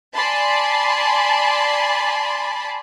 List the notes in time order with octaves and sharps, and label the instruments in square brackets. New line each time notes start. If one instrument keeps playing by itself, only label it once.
[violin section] D5 G#5 A5 B5 C6